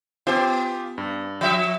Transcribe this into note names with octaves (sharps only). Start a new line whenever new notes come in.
B3 F4 G4 G5
G2
F3 E5